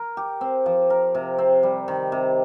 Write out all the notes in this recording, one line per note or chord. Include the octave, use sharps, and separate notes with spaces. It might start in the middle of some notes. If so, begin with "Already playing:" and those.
Already playing: A#4
G4
C4
F3
A#4
C3
C4
G3
D#3
C3